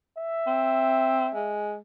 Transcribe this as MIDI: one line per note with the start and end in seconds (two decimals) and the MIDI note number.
0.17 1.56 76
0.47 1.28 60
1.35 1.76 56